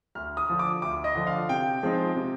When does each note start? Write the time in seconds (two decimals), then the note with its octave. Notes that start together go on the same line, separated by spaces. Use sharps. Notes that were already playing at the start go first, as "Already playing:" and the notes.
0.15 D2 F6
0.37 D#6
0.49 D3 F3
0.59 D6
0.82 D2 D6
1.04 D#5
1.15 D3 F3
1.27 F5
1.49 C3 G5
1.83 F3 G#3 C4 D#4
2.16 C3